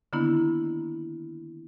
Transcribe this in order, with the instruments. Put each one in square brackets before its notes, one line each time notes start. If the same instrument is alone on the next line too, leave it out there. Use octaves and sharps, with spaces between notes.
[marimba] D3 D#3 A#3 B3 D4 E4